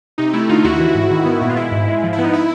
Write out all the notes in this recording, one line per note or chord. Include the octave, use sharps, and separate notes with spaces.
C3 D#4
A3 E4
D3 D#4 F4
D#2 E4 F#4
E3
G#2
D#3
B3
A#2 E4
F4
G#3 E4
G#2
G#3
F3
E4
B3
D#4
E4